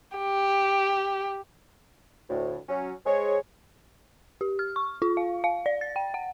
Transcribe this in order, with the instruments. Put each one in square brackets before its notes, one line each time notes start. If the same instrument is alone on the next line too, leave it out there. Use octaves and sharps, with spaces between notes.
[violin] G4
[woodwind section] D2 A2
F#3 C#4
G#3 G#4 C5 C#5
[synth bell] G4
F6
C#6
F4
F5
F5
D5
A6
G5
F#5